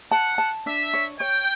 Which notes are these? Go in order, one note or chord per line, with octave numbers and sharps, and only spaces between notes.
F#5 A5
A5
D4 E5
C#5
C#5 G5